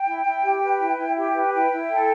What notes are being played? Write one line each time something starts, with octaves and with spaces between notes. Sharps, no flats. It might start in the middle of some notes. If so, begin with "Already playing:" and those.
Already playing: G5
E4
E4
G4
B4
E4
E4
G4
B4
E4 G5
E4
A4